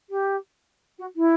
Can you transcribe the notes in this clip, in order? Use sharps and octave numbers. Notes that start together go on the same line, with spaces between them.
G4
F#4
E4